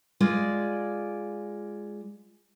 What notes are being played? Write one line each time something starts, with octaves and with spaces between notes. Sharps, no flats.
G#3 F4 D5